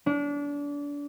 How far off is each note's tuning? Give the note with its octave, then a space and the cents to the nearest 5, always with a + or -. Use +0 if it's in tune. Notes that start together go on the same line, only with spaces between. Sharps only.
D4 -30